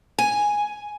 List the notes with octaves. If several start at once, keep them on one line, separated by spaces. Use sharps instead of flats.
G#5